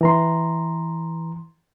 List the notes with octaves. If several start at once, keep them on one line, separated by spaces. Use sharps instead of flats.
E3 A#5 C6